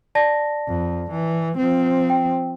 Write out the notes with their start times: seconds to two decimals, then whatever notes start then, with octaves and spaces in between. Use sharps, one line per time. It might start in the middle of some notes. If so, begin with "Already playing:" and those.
0.15 D5 A5 A#6
0.67 F2
1.11 E3
1.57 F3 C4
2.10 G5